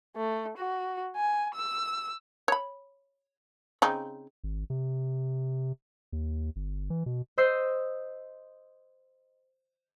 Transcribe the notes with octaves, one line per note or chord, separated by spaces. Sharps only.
A3
F#4
G#5
E6
C#5 B5
C#3 C4 D#4
G#1
C3
D#2
G1
E3
B2
C5 D#5 E6 G6 C7